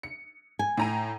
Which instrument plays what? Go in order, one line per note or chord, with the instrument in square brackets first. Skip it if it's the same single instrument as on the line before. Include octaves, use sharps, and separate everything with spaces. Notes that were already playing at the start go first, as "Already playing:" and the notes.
[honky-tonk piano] C#7
[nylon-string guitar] G#5
[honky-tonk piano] A2 A#5 D#7